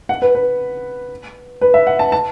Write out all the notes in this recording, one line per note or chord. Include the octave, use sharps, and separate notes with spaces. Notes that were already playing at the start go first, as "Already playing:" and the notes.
F#5
B4
B4
B4
E5
F#5
A5
A5